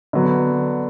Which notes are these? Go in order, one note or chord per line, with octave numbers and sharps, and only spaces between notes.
D3 F#3 B3